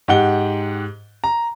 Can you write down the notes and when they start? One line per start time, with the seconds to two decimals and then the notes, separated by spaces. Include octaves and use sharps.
0.08 G#2 G4 F#5 G7
1.24 A#5